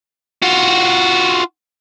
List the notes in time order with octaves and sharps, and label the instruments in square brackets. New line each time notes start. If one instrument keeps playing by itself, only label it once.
[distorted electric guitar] F4 F#4